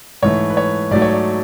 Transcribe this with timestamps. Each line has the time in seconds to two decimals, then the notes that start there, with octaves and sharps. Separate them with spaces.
0.22 G#2 E3 A3 C#5
0.50 B4
0.57 C#5
0.91 G#2 F#3 A3 D5
1.02 C#5
1.12 D5